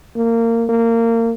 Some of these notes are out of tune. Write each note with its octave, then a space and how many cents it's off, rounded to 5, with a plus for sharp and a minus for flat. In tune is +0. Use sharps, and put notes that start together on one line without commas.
A#3 -20
A#3 -25